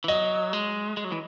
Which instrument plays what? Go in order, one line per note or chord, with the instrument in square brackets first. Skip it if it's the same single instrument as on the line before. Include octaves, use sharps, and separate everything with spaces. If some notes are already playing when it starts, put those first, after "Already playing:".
[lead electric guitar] E3
[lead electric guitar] F#3 [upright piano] D#5
[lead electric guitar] G#3
G#3
F#3
E3